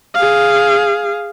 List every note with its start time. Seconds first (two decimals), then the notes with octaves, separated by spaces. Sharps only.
0.15 G#4 F5